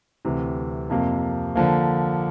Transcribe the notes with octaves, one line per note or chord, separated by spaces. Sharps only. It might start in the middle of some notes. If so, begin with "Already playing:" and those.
D2 C3 E3
F2 C3 F3 A#3
D3 F3 A#3